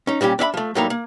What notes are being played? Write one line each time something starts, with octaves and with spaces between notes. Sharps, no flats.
C#4 D#4
A#2 G3 C#4 G4
D4 E5 F5 B5
F3 A3
A2 F#3 G3 A#3 D#4 A#5
A#3